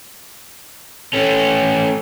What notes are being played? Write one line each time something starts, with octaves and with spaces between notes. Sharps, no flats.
A3 C#4